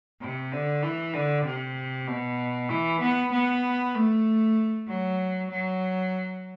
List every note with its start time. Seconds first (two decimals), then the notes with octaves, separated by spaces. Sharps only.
0.21 C3
0.52 D3
0.83 E3
1.14 D3
1.45 C3
2.08 B2
2.69 E3
3.01 B3
3.32 B3
3.95 A3
4.88 F#3
5.50 F#3